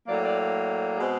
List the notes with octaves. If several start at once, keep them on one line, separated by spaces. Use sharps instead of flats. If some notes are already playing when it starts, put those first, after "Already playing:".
A2 F#3 A#3 D5
D5
D5
B2 G#3 C4 G#4